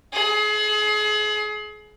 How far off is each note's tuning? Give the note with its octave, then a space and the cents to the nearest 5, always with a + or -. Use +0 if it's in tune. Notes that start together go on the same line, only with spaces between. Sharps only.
G#4 +35